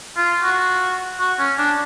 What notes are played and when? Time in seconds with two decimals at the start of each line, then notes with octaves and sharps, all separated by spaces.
0.17 F4
0.42 F#4
1.20 F#4
1.39 C#4
1.59 D4